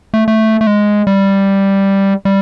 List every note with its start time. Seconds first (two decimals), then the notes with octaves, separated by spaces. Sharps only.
0.14 A3
0.28 A3
0.61 A3
0.67 G#3
1.07 G3
2.25 G3